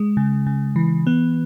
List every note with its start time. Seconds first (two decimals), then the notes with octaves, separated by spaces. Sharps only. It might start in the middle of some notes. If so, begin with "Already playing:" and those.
Already playing: G#3
0.17 C#3
0.47 C#3
0.76 E3
1.07 B3